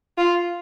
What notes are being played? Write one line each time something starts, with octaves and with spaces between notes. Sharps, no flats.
F4